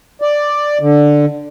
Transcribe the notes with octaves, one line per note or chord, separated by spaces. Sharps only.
D5
D3